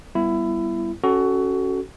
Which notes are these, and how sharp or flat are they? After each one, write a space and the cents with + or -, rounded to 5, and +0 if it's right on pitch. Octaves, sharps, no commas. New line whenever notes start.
G3 +0 B3 +0 E4 +20
C#4 +0 F#4 +20 A4 +0